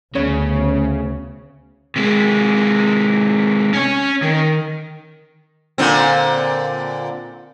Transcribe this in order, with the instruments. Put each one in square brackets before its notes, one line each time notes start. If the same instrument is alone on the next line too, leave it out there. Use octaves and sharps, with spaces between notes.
[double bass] D2 [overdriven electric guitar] C#3 [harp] B3 C#5
[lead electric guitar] C3 G#3
C#4 C#5
D#3
[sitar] A#2 D3 C4